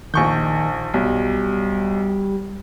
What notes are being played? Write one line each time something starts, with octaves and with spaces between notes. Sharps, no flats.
A#1 D#3 C#6 G6
B1 G3